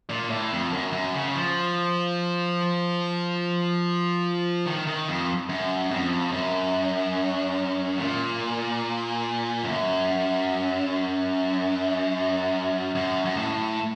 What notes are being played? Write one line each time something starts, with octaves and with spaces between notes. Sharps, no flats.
A#2
A2
F2
F#2
F#2
C#3
F3
D#3
D#3
F2
F#2
F2
F#2
A#2
F#2
F#2
F#2
A2